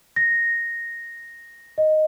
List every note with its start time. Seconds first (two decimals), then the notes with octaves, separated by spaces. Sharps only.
0.16 A#6
1.78 D#5